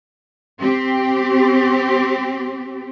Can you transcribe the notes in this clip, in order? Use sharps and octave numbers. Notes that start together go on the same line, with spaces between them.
C4 G4